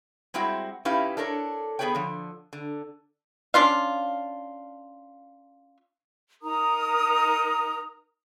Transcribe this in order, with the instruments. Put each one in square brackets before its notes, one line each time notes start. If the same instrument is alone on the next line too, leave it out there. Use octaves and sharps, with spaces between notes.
[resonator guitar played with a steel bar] G3 G#3 C4 E4 F#4 G5
C#4 D#4 E4 G4 B4 F5
D4 A4 A#4 C#5
B3 D4 G#4 B4 C#5 G5
D3 F3
D3
[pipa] C#4 D4 F4 F5
[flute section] D#4 A#4 A#5 D#6